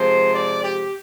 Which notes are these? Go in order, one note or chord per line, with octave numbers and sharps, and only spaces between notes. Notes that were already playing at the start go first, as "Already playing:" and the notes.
Already playing: C3 F3 G#3 C5
D5
G4